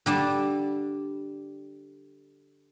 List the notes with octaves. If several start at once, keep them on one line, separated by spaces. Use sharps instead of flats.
D3 G3 A5